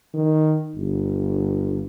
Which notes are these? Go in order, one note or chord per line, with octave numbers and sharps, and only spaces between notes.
D#3
G1